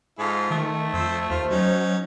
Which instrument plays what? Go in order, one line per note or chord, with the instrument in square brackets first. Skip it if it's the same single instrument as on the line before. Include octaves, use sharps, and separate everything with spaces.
[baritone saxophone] G#2 [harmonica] F4 A4
[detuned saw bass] D#3 [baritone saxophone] A3
[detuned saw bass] F2 [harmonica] C5 E6
[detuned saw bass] D#2 [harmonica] F4 [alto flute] C5
[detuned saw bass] F#3 [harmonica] C#4 D#4